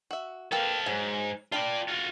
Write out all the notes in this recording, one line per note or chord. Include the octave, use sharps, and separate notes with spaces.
F#4 E5
A#3 G4 A4 B4 F5
G#2 F#3 G#5
D4 F4 D5 G5 B5
F4 F#4